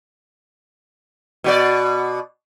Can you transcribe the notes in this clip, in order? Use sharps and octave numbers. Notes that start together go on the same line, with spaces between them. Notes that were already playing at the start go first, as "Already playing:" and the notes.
B2 F#4 D5